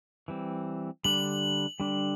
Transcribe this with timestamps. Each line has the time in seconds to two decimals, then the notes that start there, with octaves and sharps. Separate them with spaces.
0.28 E3 G3 C4
1.04 D3 G3 D4 F#7
1.80 D3 G3 D4